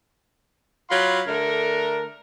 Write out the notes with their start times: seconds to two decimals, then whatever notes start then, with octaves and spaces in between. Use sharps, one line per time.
0.89 F#3 F4 F5 B5 C6
1.27 D3 A3 D4 A#4